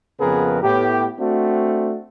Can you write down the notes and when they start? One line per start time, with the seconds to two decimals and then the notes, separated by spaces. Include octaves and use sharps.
0.20 F2 C#3 B3 G#4 A#4 B4
0.62 A2 B3 G4
1.20 A3 C4 D4 F#4